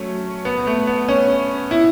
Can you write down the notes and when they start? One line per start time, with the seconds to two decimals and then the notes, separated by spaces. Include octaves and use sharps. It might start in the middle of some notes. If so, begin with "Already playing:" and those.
Already playing: F#3 A3 C#4
0.45 B3
0.67 A3
0.87 B3
1.09 C#4
1.71 E4